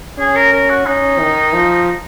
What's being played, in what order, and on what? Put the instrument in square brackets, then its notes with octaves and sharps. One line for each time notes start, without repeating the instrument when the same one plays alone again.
[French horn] C#4 [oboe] G#4
[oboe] A#4
A#4
F#4
[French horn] C#4 [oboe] D#4
[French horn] D#3
F3